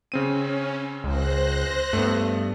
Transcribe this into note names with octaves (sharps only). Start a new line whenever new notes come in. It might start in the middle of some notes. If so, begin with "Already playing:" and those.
C#3 C4 C#4 D#7
C#2 C5 F#6 A#6
G2 A3 B3